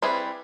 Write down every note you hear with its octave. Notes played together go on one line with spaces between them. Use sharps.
G3 C4 E4 G#4 B4